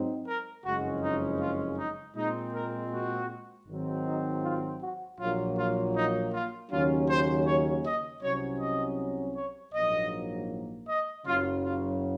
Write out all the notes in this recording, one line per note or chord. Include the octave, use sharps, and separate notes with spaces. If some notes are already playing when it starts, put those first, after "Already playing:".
Already playing: G#2 F#3 C4 D#4
A#4
F#1 F2 C#3 G#3 C#4 F#4
D#4
F4
D#4
A#2 G#3 C4 D#4
A#4
F#4
G#1 G#2 D#3 F#3 C4
D#4
F4
F#4
A#1 A#2 F#3 A#3 F4
F4
D#4
F4
D#2 C#3 F#3 C#4 F4
C5
C#5
D#5
C2 C3 F#3 C#4 C#5
D#5
C#5
A#1 G#2 F#3 A#3 D#5
D#5
F#1 F#2 C#3 F#3 F4
F4